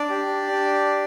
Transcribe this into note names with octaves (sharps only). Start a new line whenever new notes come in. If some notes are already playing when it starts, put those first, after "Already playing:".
Already playing: D4 D5
G4
D4